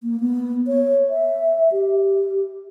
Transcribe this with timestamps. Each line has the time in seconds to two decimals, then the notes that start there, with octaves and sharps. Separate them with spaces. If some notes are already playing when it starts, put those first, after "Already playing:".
0.03 A#3
0.20 B3
0.68 C#5
1.09 E5
1.72 G4